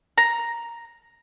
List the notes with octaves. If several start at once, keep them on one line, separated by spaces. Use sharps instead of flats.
A#5